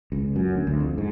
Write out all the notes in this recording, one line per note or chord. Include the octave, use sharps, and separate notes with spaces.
C#2
F#2
D2
D2
F2
G#2